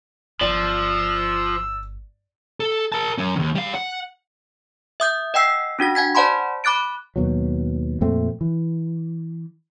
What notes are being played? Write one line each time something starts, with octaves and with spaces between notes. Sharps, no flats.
G1 F3 D5 E6
A4
A#4 A5
F#3 C#4
D#2 D#3
G3 F5
F#5
E5 D#6 G6
D#5 F#5 G5 E6 C7
C#4 D4 F#4 A#6
F#5 G#5 G#6 B6
C5 D5 F#5 A5 B5 C6
B5 D6 F#6 A6 D7
D#2 B2 F#3
F2 A#2 A3 C4
E3